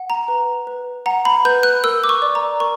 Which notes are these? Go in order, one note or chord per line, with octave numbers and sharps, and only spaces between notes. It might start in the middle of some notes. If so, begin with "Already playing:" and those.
Already playing: F#5
A#5
B4
B4
F#5 A#5
B5
B4 G6
F#6
A#4 E6
D6
C#6
D5
A#5
A#4 C#6